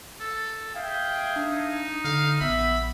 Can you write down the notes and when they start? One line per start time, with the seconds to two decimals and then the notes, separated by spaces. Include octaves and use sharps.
0.20 A4
0.75 G#4 E5 F5 G5
1.36 D4 D#4
2.04 D3 F5
2.41 A#1 B3 E5 B5